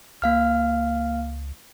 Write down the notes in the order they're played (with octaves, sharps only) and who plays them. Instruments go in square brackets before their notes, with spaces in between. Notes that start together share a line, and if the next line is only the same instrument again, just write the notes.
[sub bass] C#2 [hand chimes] A#3 F5 F6